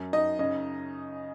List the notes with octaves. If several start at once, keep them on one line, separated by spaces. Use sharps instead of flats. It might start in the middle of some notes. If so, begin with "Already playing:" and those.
Already playing: F#2
D#4 D#5
C#3 D#5